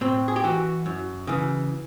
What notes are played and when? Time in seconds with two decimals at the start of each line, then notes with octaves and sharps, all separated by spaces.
0.01 A2 C4
0.28 G#4
0.36 G4
0.44 E3 F#4
0.86 F#2
1.27 C#3 E3